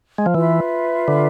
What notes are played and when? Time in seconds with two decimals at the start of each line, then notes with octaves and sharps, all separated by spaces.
0.18 G#3
0.26 F3
0.35 E3 F4 B4 E5 B5
1.08 D3